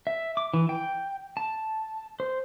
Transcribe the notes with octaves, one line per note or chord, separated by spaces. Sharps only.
E5
D6
E3
G5
A5
C5